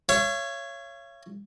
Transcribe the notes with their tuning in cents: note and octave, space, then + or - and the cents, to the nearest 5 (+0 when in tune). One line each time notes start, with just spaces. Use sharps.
C#5 +0 F5 -45